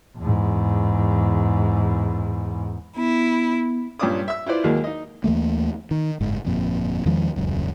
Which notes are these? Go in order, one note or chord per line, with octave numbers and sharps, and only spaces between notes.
E2 G#2
B3 E4
G2 A#2 C#4 D4 D6 D#6
E5 E6
E4 F4 B4 C5 D5
D#2 F#3 G#3 A#3
D#4 D#5
D#2 E3 A3 A#3
D#3
F#1 G#2
G1 F2 A#2
E2 D#3 F3 G#3
D#1 C#2 F#2